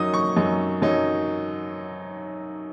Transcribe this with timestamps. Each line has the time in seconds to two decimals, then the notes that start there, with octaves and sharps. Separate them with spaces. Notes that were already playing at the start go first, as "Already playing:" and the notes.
Already playing: F#2 F#3 D#4 D#6
0.14 C#6
0.36 F#2 F#3 D#4
0.82 F#2 F#3 D#4